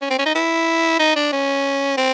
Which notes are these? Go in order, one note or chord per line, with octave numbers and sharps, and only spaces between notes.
C#4
C4
C#4
D#4
E4
D#4
D4
C#4
C4